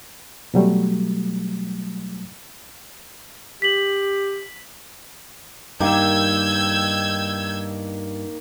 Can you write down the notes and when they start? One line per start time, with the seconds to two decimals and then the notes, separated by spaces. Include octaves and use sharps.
0.54 B2 F#3 G3 A3
3.62 G4 B6 F#7
5.80 G2 D#3 A#3 E6 G6 G#6